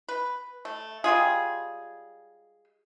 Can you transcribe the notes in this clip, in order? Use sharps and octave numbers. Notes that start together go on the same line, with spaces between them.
B4
A3
G3 G#3 F4 G#4